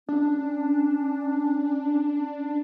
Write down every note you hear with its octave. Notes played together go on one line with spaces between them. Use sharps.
C#4 D4